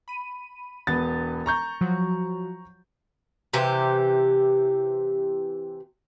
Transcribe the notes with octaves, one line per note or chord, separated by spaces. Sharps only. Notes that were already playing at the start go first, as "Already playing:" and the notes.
B5 D#7
E1 B3 A6
A#5 C#6 G6
F3 F#3 F#4
C3 E3 G4